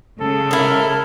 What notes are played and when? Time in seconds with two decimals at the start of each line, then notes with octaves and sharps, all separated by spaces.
0.20 C#3 G#3 A4
0.51 E4 A#4